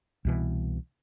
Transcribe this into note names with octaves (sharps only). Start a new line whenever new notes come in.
C2 B2 E3